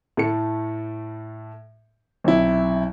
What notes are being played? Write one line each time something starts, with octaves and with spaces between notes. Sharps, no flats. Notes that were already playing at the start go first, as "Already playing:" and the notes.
A2 A3 C#7
B1 C3 E4